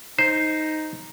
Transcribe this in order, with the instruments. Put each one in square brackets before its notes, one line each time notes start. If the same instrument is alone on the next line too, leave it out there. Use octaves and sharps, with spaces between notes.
[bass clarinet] D#4 [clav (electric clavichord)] C5